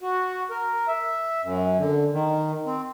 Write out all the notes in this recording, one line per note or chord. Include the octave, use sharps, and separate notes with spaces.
F#4
A#4
E5
F#2
D3
D#3
C4